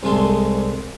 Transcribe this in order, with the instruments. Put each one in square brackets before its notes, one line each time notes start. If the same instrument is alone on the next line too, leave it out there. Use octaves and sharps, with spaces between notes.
[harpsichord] C2 C3 G#3 A4 C6